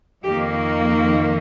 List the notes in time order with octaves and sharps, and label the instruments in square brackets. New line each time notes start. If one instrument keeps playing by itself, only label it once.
[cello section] F2 D#3 A#3 G4